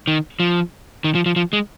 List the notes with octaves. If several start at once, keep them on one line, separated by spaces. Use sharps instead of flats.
D#3
F3
D#3
F3
F3
F3
G#3